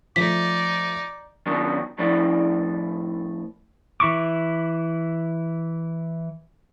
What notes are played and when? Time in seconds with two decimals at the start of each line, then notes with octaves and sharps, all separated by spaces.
0.16 F3 A3 D#4 D5 D6 B6
1.46 D#3 F#3 B3 D4
1.98 F2 A2 F3 E4 D5
4.00 E3 E4 C#6 D6